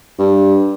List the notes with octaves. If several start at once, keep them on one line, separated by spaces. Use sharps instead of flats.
G2